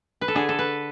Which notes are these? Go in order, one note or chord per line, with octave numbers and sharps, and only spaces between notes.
B4
A4
D3 G#4
A4
B4